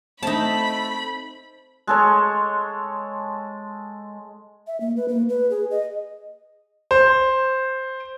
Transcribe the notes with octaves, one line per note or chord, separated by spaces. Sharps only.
A3 C4 D#4 A5 B5
G#3 A4 C#5
E5
A#3
B4
A#3
B4
G#4
D#5
C5